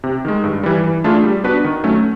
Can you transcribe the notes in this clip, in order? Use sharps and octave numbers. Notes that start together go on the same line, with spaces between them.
C3
D#3 G#3
G2
E3 G3
E3
A3 D4 F4 G#4
G3
B3 D4 F#4 B4
D#3
F#3 A3 C#4